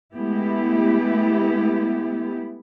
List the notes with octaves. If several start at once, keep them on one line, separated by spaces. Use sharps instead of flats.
G#3 A3 B3 E4 G4